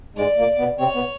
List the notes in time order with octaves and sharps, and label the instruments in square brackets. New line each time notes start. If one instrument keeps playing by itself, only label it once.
[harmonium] G#2 G#3 [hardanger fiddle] D5
[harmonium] A#2 A#3
B2 B3
[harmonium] C3 C4 [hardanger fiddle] C#5
[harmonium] B2 B3